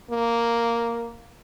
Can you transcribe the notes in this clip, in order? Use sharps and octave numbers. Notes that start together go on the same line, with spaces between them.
A#3